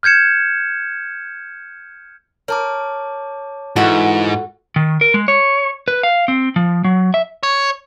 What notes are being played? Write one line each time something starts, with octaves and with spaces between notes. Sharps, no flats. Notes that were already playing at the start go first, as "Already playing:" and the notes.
F6 G6 G#6 C#7 E7
A#4 C#5 A5 D6
G#2 E3 F4 F#4 A4 E5 F#5
D#3
A#4
G#3
C#5
B4
F5
C4
F3
F#3
E5
C#5